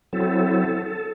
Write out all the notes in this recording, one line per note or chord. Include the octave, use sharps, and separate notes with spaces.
F#3 C4 E4 A4
A4